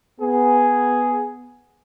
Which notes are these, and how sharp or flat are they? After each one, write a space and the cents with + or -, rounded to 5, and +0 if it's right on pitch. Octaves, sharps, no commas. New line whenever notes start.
B3 +0 G#4 +0